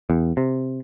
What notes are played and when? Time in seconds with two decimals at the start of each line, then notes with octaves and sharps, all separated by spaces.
0.10 E2
0.37 C3